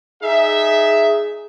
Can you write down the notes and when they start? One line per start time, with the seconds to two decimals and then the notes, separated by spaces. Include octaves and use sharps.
0.23 D#4 G#4 E5